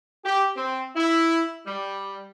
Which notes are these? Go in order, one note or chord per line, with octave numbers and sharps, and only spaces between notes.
G4
C4
E4
G3